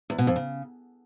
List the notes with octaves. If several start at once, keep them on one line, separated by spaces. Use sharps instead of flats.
E2
B2
F2
C#3